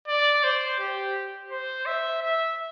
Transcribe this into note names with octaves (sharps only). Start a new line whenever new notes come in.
D5
C5
G4
C5
E5
E5